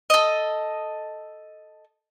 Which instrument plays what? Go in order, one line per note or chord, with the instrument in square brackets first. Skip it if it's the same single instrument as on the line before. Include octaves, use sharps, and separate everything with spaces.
[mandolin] A4 D#5